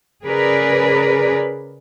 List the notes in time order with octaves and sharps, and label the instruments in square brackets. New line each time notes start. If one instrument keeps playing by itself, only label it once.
[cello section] C#3 G#4 A#4 B4 D5